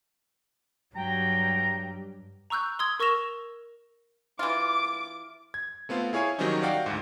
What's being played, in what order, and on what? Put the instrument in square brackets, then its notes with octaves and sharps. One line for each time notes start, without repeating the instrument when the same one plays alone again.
[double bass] G2 G3 [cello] F#3 [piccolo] G5 [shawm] A#5
[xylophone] A#5 C#6 E6 F#6 G6
C6 D#6 E6 G#6
A#4 C#6 E6 A#6 E7 F7
[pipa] E3 F4 [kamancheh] D6
[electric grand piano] G#6
A3 B3 C4 F4
E4 G#4 C#5 F5 G#5
D#3 F#3 G3 C4 C#4 D#4
F#4 D5 F5 G5
D2 G#2